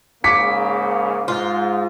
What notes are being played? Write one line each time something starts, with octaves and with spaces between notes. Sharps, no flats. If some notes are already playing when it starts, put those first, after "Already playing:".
G#2 C#3 A#3 D6 B6 C#7
G#2 F4